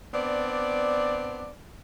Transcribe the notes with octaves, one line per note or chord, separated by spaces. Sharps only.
B3 C4 D4 D5